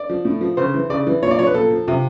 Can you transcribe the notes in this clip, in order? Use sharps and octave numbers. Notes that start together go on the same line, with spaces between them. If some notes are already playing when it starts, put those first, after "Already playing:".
Already playing: D5
F3
A2
F3
C#3 C5
E3
C#3 D5
E3
A#2 C#5
D5
F3 C#5
B4
A#2 A4
F3
C3 F4